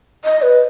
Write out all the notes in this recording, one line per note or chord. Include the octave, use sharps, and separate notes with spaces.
D#5
B4